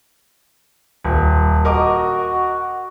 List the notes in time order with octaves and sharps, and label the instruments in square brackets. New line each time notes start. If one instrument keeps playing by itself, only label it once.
[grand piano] D#1
[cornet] F#4 [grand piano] A#4 D#5 D6